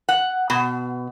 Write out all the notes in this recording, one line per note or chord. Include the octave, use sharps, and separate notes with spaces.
F#5
B2